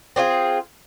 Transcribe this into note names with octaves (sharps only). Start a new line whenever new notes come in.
C4 D4 F4 G#4